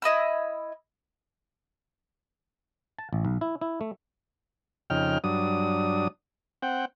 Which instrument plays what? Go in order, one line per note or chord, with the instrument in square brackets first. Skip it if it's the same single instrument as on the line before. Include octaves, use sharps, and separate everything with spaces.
[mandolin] E4 D#5 B5 E6
[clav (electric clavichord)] A5
A1
B1
E4
E4
A3
[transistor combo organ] F2 C#3 D#4 G5 F6
G2 F#3 D4 D#6
C4 F#5 G5